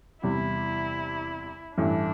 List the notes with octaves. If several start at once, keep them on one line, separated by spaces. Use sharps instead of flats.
E2 C3 G3 E4
A1 G2 E3 A3 D4 E4